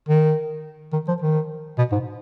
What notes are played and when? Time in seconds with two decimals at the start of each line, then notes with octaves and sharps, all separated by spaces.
0.09 D#3
0.93 D#3
1.08 F3
1.22 D#3
1.78 B2
1.92 G#2